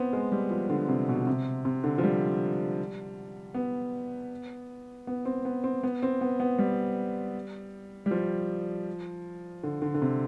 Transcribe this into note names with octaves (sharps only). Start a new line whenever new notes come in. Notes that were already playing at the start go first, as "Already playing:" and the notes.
Already playing: B3 C4
G#3
G3
F3
D3
C3
B2
C3
C3
D3
F3
G3
B3
B3
C4
B3
C4
B3
C4
B3
B3
G3
G3
F3
D3
D3
D3
C3